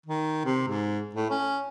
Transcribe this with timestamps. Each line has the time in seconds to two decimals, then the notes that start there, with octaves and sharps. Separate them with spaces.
0.06 D#3
0.45 C3
0.68 G#2
1.15 A2
1.30 C#4